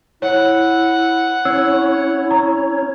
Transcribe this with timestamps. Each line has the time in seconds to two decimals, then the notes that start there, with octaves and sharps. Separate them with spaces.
0.22 E4 C#5 F#5
1.45 C#4 E4 C#5 E6
2.31 A#5